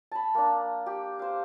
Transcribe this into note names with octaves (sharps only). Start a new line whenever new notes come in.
A5 B5
A#3 D4
G4
C5 F5